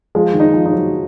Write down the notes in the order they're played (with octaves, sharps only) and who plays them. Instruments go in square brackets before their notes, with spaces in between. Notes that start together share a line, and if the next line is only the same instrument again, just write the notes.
[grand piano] F3 [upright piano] G#3
[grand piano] D#3
[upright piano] D#4
[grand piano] F3
[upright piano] D#4
[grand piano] F#3